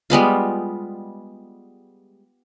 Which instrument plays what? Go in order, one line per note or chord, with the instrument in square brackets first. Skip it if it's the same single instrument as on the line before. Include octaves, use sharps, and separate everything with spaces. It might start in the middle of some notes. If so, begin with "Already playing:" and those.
[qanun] G3 G#3 B3 F4